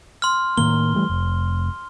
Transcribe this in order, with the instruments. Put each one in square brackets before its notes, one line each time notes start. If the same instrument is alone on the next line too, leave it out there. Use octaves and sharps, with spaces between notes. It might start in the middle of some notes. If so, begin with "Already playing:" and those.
[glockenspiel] C6 F6
[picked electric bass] A2 D#3 A#3 [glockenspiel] G7
[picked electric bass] E3 G3 A3
F1